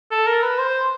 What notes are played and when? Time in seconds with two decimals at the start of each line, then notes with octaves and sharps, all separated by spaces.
0.11 A4
0.27 A#4
0.43 B4
0.59 C5